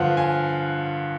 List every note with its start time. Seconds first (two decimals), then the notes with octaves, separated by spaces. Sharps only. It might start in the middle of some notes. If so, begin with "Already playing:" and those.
Already playing: G2 D3 F3 F5 F#5
0.17 G#5